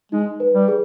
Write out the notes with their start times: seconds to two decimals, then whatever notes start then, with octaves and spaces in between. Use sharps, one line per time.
0.12 G#3 D#4
0.40 B4
0.54 G3
0.68 G#4